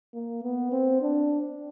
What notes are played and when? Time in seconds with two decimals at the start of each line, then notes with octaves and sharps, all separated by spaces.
0.14 A#3
0.44 B3
0.72 C4
1.02 D4